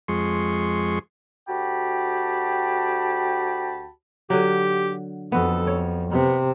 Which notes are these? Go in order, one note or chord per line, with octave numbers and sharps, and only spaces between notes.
F2 G#3 C6 C#6
D2 F#4 G4 G5 A5 B5
D3 F#3 G4
F2 B3 F#4 A4
C#5
C3 B3